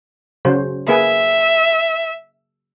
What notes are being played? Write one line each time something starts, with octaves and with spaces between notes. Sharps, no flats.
C#3 F#3 C5
A#3 G#4 B4 E5